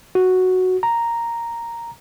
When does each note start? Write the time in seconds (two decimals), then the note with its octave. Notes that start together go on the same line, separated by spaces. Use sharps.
0.15 F#4
0.83 A#5